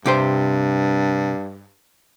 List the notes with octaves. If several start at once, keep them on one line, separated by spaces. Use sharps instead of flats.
G2 C3 G4 C5